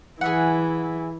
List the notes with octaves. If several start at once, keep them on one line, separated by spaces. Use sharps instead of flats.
E3 G#4 E5 F#5